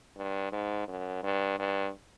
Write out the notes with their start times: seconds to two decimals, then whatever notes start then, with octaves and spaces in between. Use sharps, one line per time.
0.17 G2
0.52 G#2
0.88 F#2
1.23 G2
1.59 G2